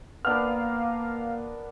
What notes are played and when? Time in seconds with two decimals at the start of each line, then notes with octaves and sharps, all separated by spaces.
0.25 A#3 B3 D4 A#4 F5 F6